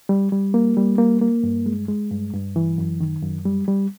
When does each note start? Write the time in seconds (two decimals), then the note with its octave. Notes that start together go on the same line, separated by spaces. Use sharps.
0.09 G3
0.32 G3
0.54 A#3
0.77 G3
0.98 A#3
1.21 A#3
1.44 G2
1.66 G#3
1.88 G#3
2.11 G2
2.33 G2
2.56 E3
2.78 F#2
3.01 D#3
3.23 F#2
3.45 G3
3.68 G3